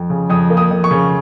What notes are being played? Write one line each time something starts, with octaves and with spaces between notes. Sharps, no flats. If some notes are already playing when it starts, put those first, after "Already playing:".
Already playing: F2
C#3
F2 D#6
A#3
D#6
F2
C#6
C#3